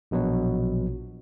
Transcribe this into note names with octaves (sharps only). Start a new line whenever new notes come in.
A#1 B2 F#3